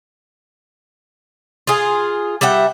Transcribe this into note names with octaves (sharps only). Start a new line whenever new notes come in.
F4 G#4
G3 E5 F#5 G5